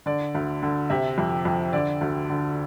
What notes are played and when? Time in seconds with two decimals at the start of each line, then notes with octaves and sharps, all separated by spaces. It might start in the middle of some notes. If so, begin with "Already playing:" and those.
0.06 D3 D5
0.35 D2
0.63 D3
0.90 C3 E5
1.18 F2
1.45 F2
1.73 D3 D5
2.01 D2
2.30 D3